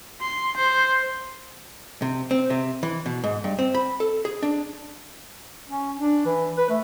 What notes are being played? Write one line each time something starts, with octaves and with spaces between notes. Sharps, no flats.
C6
C5
C3
C4
C3
E3
B2
G#2
G2
C4
B5
A4
G#4
D4
C#4
D4
E3
B4
A3